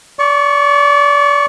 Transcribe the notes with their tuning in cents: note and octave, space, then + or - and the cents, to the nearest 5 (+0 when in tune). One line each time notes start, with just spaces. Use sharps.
D5 -30 C#6 +0